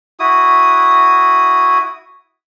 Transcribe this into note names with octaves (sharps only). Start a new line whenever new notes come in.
E4 F#4 D#6